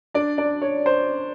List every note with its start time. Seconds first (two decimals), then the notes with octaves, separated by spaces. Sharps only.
0.14 D4 D5
0.38 D4 D5
0.62 C#5
0.86 C5